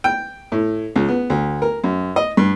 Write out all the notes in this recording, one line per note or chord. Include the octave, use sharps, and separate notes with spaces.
G5
A2
C#2
B3
D2
A#4
F#2
D#5
G2